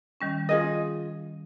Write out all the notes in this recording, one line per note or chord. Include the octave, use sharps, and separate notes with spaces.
D#3 G3 C#4
F4 G#4 D#5